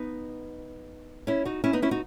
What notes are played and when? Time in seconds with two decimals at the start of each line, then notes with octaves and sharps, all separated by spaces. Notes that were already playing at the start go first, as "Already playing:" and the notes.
Already playing: B3 D#4
1.27 C#4 E4
1.45 D#4 F#4
1.64 C#4 E4
1.73 B3 D#4
1.82 C#4 E4
1.91 D#4 F#4